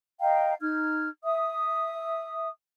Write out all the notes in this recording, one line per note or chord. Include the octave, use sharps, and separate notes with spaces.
D#5 F5 G5 A#5
D#4 F6 G#6
E5 D#6